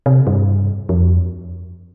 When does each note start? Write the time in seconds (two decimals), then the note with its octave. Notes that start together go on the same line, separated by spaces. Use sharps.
0.06 C3
0.27 G2
0.89 F2